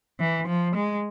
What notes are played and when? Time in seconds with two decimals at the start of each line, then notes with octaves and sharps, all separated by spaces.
0.20 E3
0.48 F3
0.76 G#3